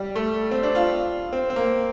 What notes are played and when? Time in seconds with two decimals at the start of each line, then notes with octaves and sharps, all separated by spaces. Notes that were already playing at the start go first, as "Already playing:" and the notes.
Already playing: G3
0.15 A3
0.51 C4
0.63 D4
0.75 F4
1.33 C4
1.50 C4
1.56 A#3